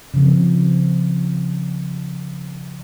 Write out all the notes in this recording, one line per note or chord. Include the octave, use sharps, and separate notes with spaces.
C#3 F3 C4